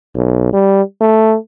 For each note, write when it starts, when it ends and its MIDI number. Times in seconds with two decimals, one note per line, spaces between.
0.15 0.52 35
0.53 0.82 55
1.01 1.36 57